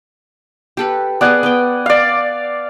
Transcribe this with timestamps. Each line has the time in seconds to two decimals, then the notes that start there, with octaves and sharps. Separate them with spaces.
0.77 G4 A4 B4
1.21 B3 G#4 D5 F#5 G#5
1.43 B3 G5
1.86 D5 F5